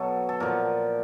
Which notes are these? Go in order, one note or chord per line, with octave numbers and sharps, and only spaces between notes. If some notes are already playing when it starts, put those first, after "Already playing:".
Already playing: B2 F#3 A4
A4
A#2 F3 A#4